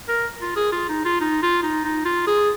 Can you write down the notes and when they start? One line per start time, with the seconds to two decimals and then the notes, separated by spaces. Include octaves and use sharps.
0.09 A#4
0.41 F4
0.56 G#4
0.72 F4
0.89 D#4
1.05 F4
1.21 D#4
1.42 F4
1.63 D#4
1.85 D#4
2.05 F4
2.27 G#4